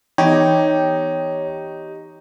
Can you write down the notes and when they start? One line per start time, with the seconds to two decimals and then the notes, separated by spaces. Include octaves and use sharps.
0.18 E3 B3 D#4 G4 C#5